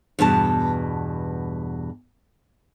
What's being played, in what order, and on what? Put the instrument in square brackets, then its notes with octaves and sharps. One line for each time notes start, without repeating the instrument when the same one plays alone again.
[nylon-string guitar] E2 G2 B2 A5